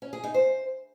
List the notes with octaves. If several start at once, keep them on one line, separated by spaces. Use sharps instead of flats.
C#4
G#4
D#4
C5